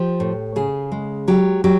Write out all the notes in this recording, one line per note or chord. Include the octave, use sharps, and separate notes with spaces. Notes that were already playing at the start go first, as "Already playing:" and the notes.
Already playing: F3 G4
A2
C#3 G#4
G#3
F#3 G4
F#3 G4